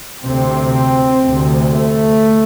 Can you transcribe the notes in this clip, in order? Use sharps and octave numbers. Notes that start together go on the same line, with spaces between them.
D2 C3 C4
D2 C3
A3